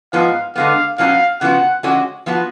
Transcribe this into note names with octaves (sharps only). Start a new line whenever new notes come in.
G#2 F3 G#3 B3 F5
D3 G#3 B3 F5
B2 F#3 C#4 F#4 F5
C#3 F3 B3 F#4 F#5
F2 D3 G#3 C#4 F#4
F3 B3 F#4